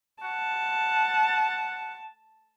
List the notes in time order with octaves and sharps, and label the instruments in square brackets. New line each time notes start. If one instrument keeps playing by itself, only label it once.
[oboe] F#5 [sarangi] A5